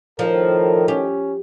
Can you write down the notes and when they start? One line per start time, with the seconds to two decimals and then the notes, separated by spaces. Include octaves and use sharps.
0.19 A2 D#3 F3 A4 A#4
0.88 C#4 G4